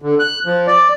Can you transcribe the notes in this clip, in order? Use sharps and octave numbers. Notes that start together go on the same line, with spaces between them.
D3
F#6
F3
D5